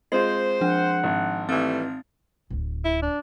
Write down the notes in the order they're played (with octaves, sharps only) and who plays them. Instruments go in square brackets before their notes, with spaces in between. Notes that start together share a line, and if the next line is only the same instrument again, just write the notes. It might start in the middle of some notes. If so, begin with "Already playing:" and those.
[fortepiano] G#3 C4 F4 [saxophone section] C5 [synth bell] D#5 C7
[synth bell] F3 D4 [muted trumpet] F#5
[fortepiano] G#1
[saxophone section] E3 G3 A3 [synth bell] C4 F6 A6
[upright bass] D1 D2
[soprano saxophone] E4
D4